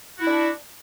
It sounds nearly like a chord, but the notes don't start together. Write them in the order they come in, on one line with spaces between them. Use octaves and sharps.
F#4 E4 D4